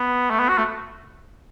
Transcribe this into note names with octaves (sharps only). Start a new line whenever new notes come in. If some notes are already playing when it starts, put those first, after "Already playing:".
Already playing: B3
A3
B3
F#4
A3